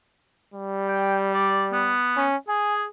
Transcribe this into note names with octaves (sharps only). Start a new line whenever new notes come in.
G3
G5
D5
B3
C#4
G#4 G#5